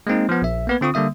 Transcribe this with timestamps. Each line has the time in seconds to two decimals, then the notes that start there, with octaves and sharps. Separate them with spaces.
0.07 G#3 A#3 C4 D#4
0.29 F3 B3
0.42 A#1 E5
0.67 A#3 B3 B4
0.81 D3 C4 F4 C#6 D#6
0.94 D3 G3 A#3 E5 D#6